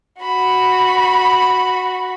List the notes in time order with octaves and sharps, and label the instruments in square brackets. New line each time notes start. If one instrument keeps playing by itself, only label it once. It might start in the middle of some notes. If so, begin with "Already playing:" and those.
[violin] F#4 B5